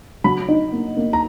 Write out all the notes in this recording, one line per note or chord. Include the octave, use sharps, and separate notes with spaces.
F#3 B5
D#4
A#3
A#3
A#5